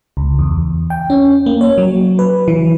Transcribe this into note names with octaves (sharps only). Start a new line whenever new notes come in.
C#2
E2
G5
C#4
A#3
C#5
F#3
B4
E3